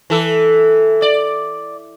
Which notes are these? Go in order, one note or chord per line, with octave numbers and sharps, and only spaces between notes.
E3 A4
D5